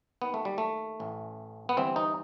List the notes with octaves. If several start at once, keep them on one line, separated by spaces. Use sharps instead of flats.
D#2 D#3 B3
A3
G3
A3
A1 A2 E3
B3
G1 G2 E3 C4
D#4